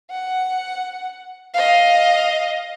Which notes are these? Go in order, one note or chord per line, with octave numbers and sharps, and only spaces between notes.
F#5
D#5 F5